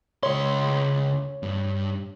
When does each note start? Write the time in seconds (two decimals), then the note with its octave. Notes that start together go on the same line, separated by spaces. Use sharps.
0.23 C#2 C#5 C6
1.43 G2